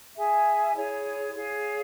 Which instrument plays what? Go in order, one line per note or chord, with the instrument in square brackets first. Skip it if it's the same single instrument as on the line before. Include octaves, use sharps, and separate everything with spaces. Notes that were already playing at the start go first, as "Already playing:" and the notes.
[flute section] G#4 E5 G#5
E4 G#4 C#5
G#4 C#5 F5